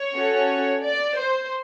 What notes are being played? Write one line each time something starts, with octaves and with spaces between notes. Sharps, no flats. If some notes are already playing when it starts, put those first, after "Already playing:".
Already playing: C#5
C#4 F#4 A4
D5
C5